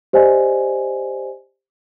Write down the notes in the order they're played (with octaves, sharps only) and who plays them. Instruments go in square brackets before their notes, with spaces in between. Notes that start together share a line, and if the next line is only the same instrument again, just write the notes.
[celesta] G4 C5 D5 D#5 G#5